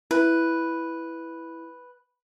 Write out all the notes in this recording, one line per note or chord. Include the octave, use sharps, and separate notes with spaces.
E4 B4